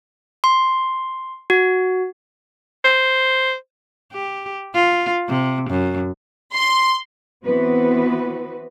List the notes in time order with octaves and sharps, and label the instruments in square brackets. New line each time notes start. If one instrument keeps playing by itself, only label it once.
[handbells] C6
F#4
[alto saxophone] C5
[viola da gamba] G4
F4
C3
F#2
[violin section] C6
[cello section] E3 B3 C4 F#4 B4